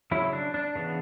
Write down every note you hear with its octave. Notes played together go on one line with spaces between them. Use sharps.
C#3 F#3 C#4 E4
D4
D4
C#3 E3 B3